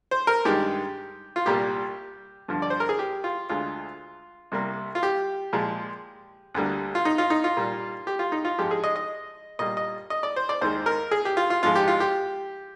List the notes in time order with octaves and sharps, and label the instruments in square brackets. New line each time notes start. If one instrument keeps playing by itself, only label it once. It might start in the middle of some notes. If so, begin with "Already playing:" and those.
[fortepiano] C5
A#4
G2 D#3 G#3 G4
F4
C2 A#2 G3 A#3 G4
G2 D3 F3
D5
C5
A#4
G#4
G4
F4
D2 D3 G#3 F4
C2 C3 G3 A#3
F4
G4
A#2 F3 G#3
D2 D3 G3 A#3
F4
D#4
F4
D#4
F4
A#2 G3 A#3
G4
F4
D#4
F4
G#2 F3 G#3 G4
G#4
D#5
D#5
A#2 G3 A#3 D#5
D#5
D#5
D5
C5
D5
D#2 D#3 G#3 C5
A#4
G#4
G4
F4
F4
G#2 F3 G#3 F4
G4
F4
G4